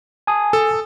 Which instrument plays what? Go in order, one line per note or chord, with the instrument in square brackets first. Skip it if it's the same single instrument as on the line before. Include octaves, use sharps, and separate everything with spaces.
[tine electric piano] G#5 A5 D#6
[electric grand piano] A4